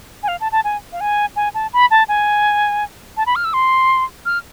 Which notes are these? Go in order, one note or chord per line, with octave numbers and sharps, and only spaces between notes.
G#5
F5
A5
A5
G#5
F5
G#5
G#5
A5
B5
A5
G#5
A5
B5
F6
E6
C6
F6